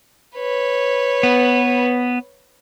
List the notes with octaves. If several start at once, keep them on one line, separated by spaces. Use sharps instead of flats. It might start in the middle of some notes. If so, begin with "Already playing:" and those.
B4 C#5
B3